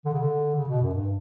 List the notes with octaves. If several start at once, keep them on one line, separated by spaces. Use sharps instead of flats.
D3
C#3
D3
C#3
B2
F#2
G2